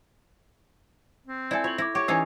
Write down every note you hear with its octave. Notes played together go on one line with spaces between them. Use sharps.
C4
E4 A4 D5 E5 G#5
F4 C#5 F#7
E4 D6 A#6
G4 C#5
E3 C#4 D#4 E6 C7 F7